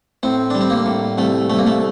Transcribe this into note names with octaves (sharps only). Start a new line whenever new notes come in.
A2 C4
G3 D4
C4
A#3
A2
C2 A3
C2 A3
A#3
A3